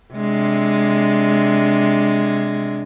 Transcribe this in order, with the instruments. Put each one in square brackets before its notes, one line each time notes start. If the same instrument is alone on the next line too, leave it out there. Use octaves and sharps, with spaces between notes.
[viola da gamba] C3 G#3 D4